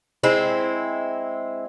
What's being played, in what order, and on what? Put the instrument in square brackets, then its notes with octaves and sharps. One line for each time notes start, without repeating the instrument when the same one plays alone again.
[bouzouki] G#3 C4 E4